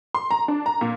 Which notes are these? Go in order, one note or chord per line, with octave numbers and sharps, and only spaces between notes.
C6
A#5
D4
A#5
A#2